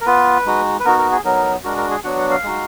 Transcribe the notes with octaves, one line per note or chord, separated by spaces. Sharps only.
A#4
B3 F4 B4
G#3 D#4 F#4
B4
B3 D#4 F#4 A#4
A#4
G#4
F#3 B3 D#4 A#4
G#3 D4 F#4 A#4
A#4
G#4
F#3 B3 D4 F#4 F#5
F#5
F5
G#3 D#4 F#4